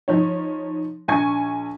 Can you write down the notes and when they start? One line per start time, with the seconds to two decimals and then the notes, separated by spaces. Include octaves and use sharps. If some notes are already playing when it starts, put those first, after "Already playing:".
0.08 F3 D#4 C#5
1.08 A#1 G#5 C#6 G#6